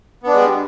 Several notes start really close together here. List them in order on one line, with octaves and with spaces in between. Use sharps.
B3 D4 G#3 G3